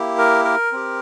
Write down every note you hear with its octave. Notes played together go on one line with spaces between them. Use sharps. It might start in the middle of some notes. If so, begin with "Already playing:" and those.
Already playing: A#3 E4 G4
A#4
A#4
C4 G4